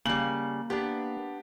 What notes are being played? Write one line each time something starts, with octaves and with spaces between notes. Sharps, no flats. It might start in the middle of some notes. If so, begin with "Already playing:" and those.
C#3 G3 A#3 F#7
B3 D4 G4